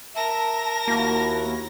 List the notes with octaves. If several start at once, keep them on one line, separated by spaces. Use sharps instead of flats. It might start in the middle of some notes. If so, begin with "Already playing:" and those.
A#4 E5 A5 A#6
D#2 A#3 E4 F#4